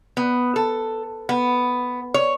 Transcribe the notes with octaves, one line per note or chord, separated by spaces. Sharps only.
B3
A4
B3
C#5